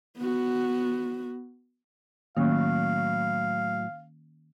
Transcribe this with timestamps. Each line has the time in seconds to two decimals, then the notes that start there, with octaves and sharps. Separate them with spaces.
0.18 B3 F#4
2.37 A2 D#3 F#3 A#3 C#4 F5